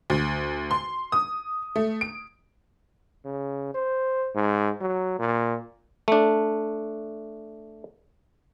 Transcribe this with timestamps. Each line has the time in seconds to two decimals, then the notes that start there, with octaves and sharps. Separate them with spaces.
0.10 D2
0.71 C6
1.12 D#6
1.76 A3
2.01 D7
3.25 C#3
3.74 C5
4.35 G#2
4.81 F#3
5.19 A#2
6.08 A3 D4